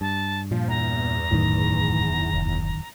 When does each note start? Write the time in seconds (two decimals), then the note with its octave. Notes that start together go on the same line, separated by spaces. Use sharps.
0.01 G2 A5
0.51 A#2 F3
0.68 E2 A#5
1.31 D1 F#2 A2 D#3
2.34 F1